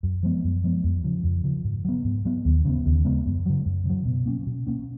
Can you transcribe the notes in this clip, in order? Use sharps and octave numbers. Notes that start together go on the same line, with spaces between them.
F#2
F3 G#3 B3
F#2
F3 G#3 B3
F2
C#3 F3
F2
C#3 F3
G#2
F#3 B3
G#2
F#3 B3
D#2
C#3 G#3 B3
D#2
C#3 G#3 B3
F#2
C#3 F#3
F#2
C#3 F#3
B2
A#3 C#4
B2
A#3 C#4